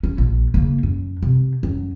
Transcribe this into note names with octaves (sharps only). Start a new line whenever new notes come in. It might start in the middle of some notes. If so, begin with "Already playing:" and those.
C#4
A#1
C#3 A#3
F#2
C3
F#2